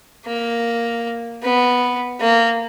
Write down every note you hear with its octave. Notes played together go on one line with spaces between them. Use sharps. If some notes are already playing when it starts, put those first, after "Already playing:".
A#3
B3
A#3